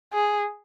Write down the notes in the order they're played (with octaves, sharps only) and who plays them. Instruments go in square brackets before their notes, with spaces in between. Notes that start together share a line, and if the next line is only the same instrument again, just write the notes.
[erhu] G#4